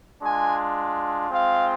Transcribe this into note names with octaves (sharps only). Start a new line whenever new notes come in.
G#3 D4 F4 G#5
G#3 C4 F4 F5